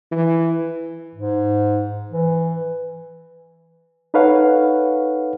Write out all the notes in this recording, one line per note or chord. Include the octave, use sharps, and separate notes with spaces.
E3
G#2
E3
D#4 A4 B4 C#5 F5 F#5